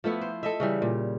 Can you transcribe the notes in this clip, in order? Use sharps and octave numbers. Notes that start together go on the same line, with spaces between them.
F3 A3 B3 E4
C5
A4 D#5 E5
C#3 E3 G3
A#2